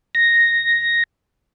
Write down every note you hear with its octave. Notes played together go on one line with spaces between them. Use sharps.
A#6